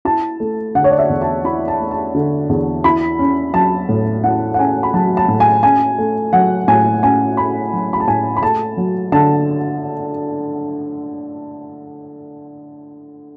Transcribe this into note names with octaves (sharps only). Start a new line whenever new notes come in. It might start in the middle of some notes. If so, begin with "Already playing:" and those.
E4 A5
A3
D3 F#5
C#5
D5
E5
E2
A5
E4 B5
A5
A3
A5
D3
E2
E4 B5
C#4
F#3 A5
A2
E4 F#5
F#5
C#4 G#5
B5
F#3 A5
A5
A2
G#5
C#4 G#5
A3
F#3 F#5
A2 G#5
C#4 G#5
A3 B5
F#3
B5
A5
A2 G#5
B5
A3 A5
F#3
D3 A5